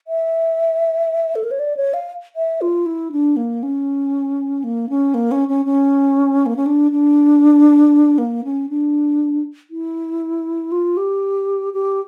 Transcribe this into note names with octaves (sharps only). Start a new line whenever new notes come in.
E5
A4
A#4
C#5
D5
C#5
F5
E5
F4
E4
D4
A#3
C#4
A#3
C#4
A#3
C#4
C#4
C#4
A#3
C#4
D4
D4
A#3
C#4
D4
E4
F4
G4
G4